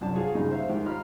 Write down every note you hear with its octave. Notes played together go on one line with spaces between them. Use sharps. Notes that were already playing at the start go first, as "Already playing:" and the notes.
C2 F#2 D4 A5
F4 F#4 G#4 F5
G2 A#2 C#3 G#3 D#4
C5 E5 F5
G#2 D#3 G3
F4 C5 D#5 A#5 B5 F6